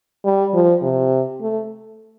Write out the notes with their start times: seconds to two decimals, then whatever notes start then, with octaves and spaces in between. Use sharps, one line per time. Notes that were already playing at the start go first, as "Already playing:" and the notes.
0.25 G3
0.54 F3
0.83 C3
1.41 A3